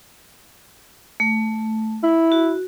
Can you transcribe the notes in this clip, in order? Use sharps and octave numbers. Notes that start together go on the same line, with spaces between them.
A3
E4
F#4